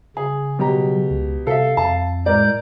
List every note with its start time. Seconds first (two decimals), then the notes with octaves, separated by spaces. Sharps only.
0.17 C#3 G#4
0.59 B2 F#3 G4 A#5
1.10 C#2
1.47 C3 A4 E5 F5
1.77 F2 A5
2.26 A2 G#3 A#4 D5 G6